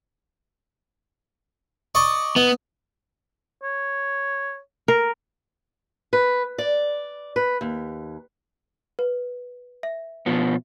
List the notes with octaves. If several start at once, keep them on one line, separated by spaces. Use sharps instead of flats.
D5 D#5 C#6
B3 D#4
C#5
A#4
B4
D5
B4
D#2
B4
E5
B2 F3 B3